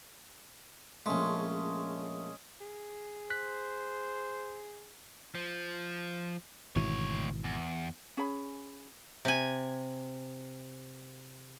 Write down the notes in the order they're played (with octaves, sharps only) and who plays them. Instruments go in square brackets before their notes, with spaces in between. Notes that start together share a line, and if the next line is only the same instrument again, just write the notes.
[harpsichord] A#1 A3 [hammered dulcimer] G#3 C#4
[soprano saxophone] G#4
[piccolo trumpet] C5 [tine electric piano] F#6 B6
[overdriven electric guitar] F3
[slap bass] G#1 B2 E3 [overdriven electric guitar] D2 C#5
[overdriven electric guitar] E2
[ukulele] C#4 G#4 B5
[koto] C3 G#5